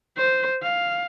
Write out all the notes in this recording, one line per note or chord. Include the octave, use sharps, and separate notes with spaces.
C5
F5